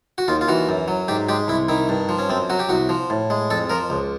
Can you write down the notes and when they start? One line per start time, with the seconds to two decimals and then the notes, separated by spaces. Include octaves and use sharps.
0.18 F#4
0.28 D#2 F4
0.41 F4
0.48 E3 F#4
0.69 F#2
0.88 F#3
1.08 G#2 G4
1.29 G#3 G4
1.48 C2 E4
1.69 D#3 E4
1.89 G2
2.09 F3
2.19 C#4
2.29 F#2 C4
2.50 F#3 F#4
2.59 G4
2.69 C2 F#4
2.89 F3
3.10 A2
3.30 G#3
3.50 F2 A4
3.70 F3 A#4
3.90 C#2